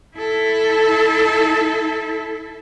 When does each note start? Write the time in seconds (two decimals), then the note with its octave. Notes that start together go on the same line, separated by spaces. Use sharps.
0.17 E4 A4